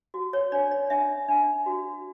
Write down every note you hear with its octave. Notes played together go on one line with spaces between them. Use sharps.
F#4
C#5
D4 D5
D5
D4 E5
D4
F#4